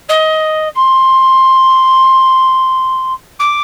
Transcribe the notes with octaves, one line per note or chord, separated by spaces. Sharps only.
D#5
C6
D6